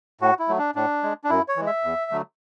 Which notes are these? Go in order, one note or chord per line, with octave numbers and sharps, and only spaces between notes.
A2 F#4
E4
F#3 A3
D4
A2 D4
G#3
D4
F#2 E4
C#5
E3 G#3
E5
E2
D3 F#3 A3